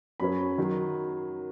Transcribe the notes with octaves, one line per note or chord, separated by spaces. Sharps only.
F#2 F#3 C#4 B5
D#3 F#3